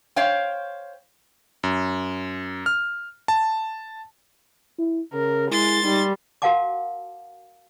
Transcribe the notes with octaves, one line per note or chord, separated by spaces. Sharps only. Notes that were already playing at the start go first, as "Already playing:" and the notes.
C5 C#5 F5 G5
F#2
F6
A5
E4
C#3 A#4
G#3 E4 C6 A6
G3 D#4
F#4 A#4 F5 F#5 A5 D6